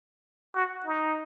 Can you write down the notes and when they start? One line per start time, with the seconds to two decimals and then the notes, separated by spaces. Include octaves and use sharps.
0.55 F#4
0.85 D#4